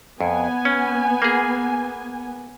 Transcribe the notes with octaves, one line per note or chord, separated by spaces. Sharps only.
F2 B3 G#5
C#4
A#3 G#4